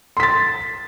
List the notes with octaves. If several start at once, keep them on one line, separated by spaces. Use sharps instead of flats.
C6 A6 B6